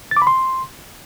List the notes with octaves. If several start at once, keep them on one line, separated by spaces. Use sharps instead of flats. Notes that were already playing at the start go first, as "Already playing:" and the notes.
A6
D6
B5
C6